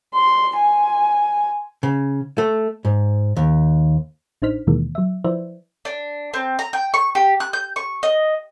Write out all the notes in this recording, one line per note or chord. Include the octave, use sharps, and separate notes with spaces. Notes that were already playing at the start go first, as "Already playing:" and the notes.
C6
G#5
C#3
A3
G#2
D#2
A1 D4 D#4 C5 F6 B6
D#2 B2 D#3 E3 G#3 A#3
F#3 E5
F3 E4 B4 C5 D5 E5
D4
C4
A#5
G5
C#6
G4
F#6
G6
C#6
D#5